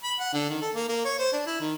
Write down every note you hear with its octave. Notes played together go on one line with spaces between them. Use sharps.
B5
F#5
D3
D#3
A4
A#3
A#3
C#5
C5
D4
E4
D#3